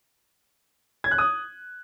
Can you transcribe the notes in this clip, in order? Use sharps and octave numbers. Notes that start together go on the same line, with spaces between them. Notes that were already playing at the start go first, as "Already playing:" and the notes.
G#6
F#6
D#6